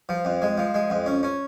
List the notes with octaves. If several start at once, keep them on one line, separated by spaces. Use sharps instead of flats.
F3
F2
G#3
F3
G#3
F2
C#4
C#4